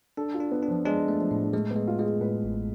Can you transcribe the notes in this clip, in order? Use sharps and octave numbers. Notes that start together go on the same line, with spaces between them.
D4 A4
F4
D4
B3
D4
F3
G#3 D4
A3
F3
A2
G#3
G#3 A3
B3
G#3
F4
G#3 F4
G#4
A2 B4
A1